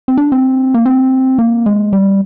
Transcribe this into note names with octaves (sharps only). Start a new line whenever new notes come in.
C4
D4
C4
A#3
C4
A#3
G#3
G3